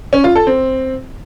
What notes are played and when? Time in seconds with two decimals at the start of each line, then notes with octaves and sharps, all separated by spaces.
0.13 C#4
0.24 F4
0.35 A4
0.47 C4